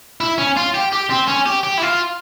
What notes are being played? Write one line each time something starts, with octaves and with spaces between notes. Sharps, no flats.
E4
C#4
F4
G4
G4
C4
C#4
G4
G4
E4
F4